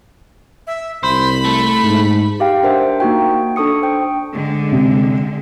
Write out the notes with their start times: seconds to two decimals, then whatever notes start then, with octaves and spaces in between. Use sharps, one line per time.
0.67 E5
1.03 C2 C5 B5
1.45 A3
1.83 G#2
2.40 G4 F5 G5
2.63 D4 A#4 C5 E5 F#5
3.00 A#3 D#4 F#4 G5
3.56 D4 A4 C#6 D#6 C#7
3.82 C5 G5
4.35 D3 G#3
4.72 C3